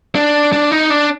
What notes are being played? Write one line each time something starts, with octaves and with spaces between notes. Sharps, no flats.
D4
D4
D#4
D4